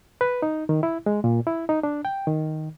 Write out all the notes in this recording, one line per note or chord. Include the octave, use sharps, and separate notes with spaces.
B4
D#4
D#3
E4
G#3
A#2
E4
D#4
D4
G5
D#3